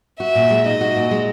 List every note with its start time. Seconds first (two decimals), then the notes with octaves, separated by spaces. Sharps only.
0.20 F#4 E5
0.35 A#2
0.50 G#3
0.66 D#4 D#5
0.81 F#4
0.96 A#2
1.11 G#3